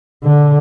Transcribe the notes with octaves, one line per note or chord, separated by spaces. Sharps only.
D3